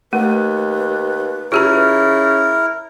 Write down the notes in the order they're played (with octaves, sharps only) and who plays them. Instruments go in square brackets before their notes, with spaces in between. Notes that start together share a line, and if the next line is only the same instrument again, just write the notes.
[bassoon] D#2 [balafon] A3 [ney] B4
[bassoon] C#3 [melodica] E4 A#4 [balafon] F4 G4 A#5